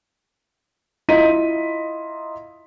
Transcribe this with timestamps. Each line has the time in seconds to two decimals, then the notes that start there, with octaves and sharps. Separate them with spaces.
1.09 E4 F4 D#5 A#5 B6 D#7